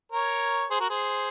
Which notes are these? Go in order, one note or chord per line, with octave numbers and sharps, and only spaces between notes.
A#4 C#5
G#4 C5
F#4 A#4
G#4 C5